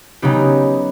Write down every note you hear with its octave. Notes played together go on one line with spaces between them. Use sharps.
C#3 F#3 B3 D#4 G4